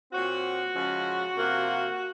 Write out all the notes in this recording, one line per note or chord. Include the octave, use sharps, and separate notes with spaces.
A#2 F#3 C4 F#4
C#3 F3 G#3 C#4
C3 F3 A#3